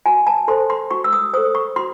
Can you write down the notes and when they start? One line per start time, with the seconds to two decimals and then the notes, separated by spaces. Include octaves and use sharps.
0.06 F#4 G#5
0.27 A5
0.48 A4 C5 C6
0.70 C6
0.91 F#4 C#6
1.04 E6
1.13 D#6
1.33 A4 C5 D#6
1.55 C#6
1.76 F#4 C6